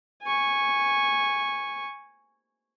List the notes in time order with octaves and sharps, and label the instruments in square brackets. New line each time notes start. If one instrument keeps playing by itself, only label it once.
[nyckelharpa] G#5 C#6